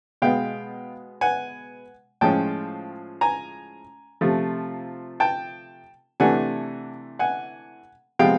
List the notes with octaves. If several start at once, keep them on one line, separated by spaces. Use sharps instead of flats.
B2 G#3 B3 F5 G5
F#5 G#5
A2 F3 G#3 C#4 G5 A5
G#5 A#5
C3 F3 A3
G5 A5
C3 E3 A3 D4 F#5 G#5
F#5 G#5
C3 F3 G#3 B3 F5 G5